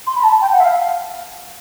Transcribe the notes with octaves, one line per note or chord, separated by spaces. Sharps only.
C6
B5
A5
G5
F#5
E5
F5